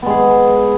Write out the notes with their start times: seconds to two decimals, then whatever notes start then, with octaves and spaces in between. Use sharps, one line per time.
0.02 B3
0.06 G#3
0.10 G#4